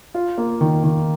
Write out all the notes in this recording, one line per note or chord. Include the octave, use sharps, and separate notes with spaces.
F4
A#3
D#3
D#3